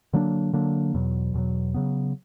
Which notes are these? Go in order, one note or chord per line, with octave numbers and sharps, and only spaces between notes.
D3 F#3 A#3 D4
D3 F#3 A#3 D4
E2 B2 F#3
E2 B2 F#3
C#3 F#3 B3